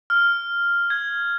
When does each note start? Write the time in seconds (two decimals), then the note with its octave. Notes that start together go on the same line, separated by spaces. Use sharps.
0.10 F6
0.90 G#6